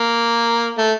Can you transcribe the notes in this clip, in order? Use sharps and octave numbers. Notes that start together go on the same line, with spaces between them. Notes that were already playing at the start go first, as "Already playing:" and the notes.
Already playing: A#3
A3